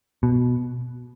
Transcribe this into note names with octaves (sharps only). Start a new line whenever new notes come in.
B2